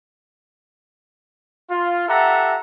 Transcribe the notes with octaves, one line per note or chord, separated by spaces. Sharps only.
F4
G4 A4 E5 F#5 A#5